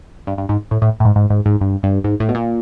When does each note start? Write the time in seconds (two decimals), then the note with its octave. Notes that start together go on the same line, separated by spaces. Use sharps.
0.27 G2
0.38 G2
0.49 G#2
0.71 A2
0.82 A2
1.00 A2
1.05 G#2
1.16 G#2
1.30 G#2
1.46 G#2
1.61 G2
1.83 G2
2.04 G#2
2.20 A2
2.29 B2
2.35 A#2